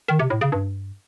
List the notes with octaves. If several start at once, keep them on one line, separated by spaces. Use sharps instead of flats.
D#3
C3
A2
C#3
G2